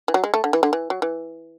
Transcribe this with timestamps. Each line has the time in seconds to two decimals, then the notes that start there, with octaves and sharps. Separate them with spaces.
0.08 E3
0.14 F#3
0.24 G#3
0.34 A3
0.44 D3
0.53 E3
0.63 D3
0.73 E3
0.90 F#3
1.02 E3